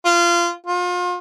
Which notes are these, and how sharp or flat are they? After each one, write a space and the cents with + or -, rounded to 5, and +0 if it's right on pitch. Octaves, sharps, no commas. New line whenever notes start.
F4 -20
F4 +35